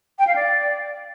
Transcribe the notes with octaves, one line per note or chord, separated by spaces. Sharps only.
G5
F5
D5